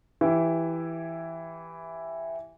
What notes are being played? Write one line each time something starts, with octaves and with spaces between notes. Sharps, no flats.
E3 E4 G4